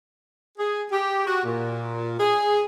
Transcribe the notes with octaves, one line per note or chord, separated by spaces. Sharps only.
G#4
G4
F#4
A#2
G#4